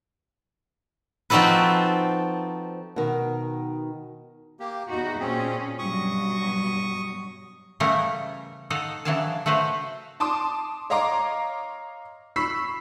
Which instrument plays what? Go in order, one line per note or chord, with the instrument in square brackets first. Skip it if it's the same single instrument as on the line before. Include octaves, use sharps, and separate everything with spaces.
[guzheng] F3 C4 D#4 F#4 A4 B4
[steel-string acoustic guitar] B2 D#3
[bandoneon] A#3 G4
[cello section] E2 F#4 [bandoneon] D#4
[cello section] A#2 C#4 [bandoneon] C4 G#4
[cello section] G2 B2 F#3 [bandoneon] C#6 D#6
[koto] C#3 E3 G3 A3 A#4 F#5
D#4 A4 F5 F#5
C#3 E3 F#3 D4 F5 A5
A3 F#4 B4 C5 F5
[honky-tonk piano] A5 C6 D6 D#6
C#5 D#5 F5 A#5 C6 D6
B5 C#6 E6 B6 C7